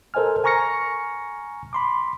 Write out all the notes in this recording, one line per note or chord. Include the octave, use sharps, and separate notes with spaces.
A4 A#4 C5 D#5 G#5 F6
G#5 A#5 C#6 F6 A#6 C#7
B5 C6 D6